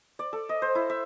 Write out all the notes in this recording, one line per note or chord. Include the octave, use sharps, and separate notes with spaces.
D5
A4
D#5
C5
E4
E5